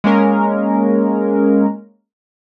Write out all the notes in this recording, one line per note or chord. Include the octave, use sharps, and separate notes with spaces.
G#3 A#3 C#4 A#4